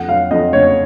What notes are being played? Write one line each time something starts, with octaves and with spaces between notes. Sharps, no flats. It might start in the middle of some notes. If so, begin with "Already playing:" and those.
Already playing: F2 F#5
F#3 F5
F2 D#5
F#1 C#5